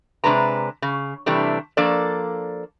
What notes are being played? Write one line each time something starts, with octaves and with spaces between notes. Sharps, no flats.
C3 G#3 D4 B4 A#5
C#3
C3 E3 G3 A3 D4
F3 A#3 D4 A4 D5